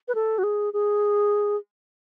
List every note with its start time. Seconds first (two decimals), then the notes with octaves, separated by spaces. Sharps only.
0.08 B4
0.15 A4
0.38 F#4
0.43 G#4
0.73 G#4